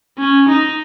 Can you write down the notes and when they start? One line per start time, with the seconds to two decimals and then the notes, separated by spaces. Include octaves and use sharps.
0.18 C#4
0.48 D#4